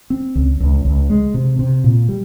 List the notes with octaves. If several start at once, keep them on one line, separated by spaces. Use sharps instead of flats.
C4
C#2
C#2
C#2
G#3
C3
C3
A#2
G3